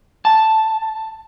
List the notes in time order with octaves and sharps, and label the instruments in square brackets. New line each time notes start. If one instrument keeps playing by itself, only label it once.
[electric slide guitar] A5